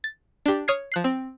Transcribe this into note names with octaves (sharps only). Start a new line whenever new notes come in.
A6
D4 G4
C#5 D#6 F6 G#6 C7
F3 F#6 C7
C4